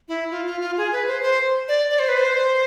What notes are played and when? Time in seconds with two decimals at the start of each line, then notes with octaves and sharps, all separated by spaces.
0.08 E4
0.31 F4
0.47 F4
0.61 F4
0.77 G#4
0.92 B4
1.07 C5
1.23 C5
1.68 D5
1.91 D5
1.99 C5
2.08 B4
2.17 C5